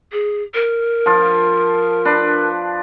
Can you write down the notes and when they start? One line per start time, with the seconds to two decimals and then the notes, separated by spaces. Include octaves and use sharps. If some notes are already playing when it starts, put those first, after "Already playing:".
0.12 G#4
0.54 A#4
1.06 F3 F4
2.05 D4 B4